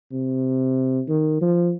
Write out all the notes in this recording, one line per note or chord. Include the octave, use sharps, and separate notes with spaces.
C3
D#3
F3